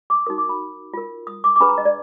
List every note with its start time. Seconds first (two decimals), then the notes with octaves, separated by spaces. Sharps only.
0.10 D6
0.26 D#4 F#4 A#4 D#6
0.38 D6
0.49 B5
0.94 F4 A#4
1.27 D#6
1.44 D6
1.56 D6
1.60 D4 G#4 B4 B5
1.69 A#5
1.78 D#5
1.85 D5